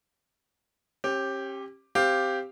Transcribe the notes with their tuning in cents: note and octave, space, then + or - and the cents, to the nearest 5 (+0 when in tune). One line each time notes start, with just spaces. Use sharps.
C#4 -40 G4 +0
C4 +0 G4 +0 F5 +0